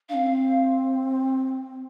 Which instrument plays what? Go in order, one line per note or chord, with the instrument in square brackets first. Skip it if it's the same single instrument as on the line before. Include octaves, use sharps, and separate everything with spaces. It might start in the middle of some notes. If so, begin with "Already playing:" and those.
[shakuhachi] C4 D4 [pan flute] F5